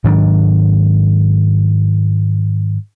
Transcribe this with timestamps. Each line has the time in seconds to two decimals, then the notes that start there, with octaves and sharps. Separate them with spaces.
0.04 G#2 D#3 F#3 D4